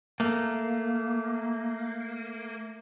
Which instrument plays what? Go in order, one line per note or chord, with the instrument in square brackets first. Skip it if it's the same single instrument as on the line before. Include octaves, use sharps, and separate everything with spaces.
[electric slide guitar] A3 A#3